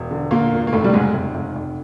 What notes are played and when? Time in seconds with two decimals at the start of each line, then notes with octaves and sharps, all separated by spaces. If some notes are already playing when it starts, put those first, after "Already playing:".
Already playing: E1
0.11 D3
0.31 A#2 D3 A#3
0.52 E1
0.67 A#3
0.73 F1 A2 A3
0.84 G3
0.93 G#2 C#3 G#3
1.14 F1
1.35 F1
1.56 F1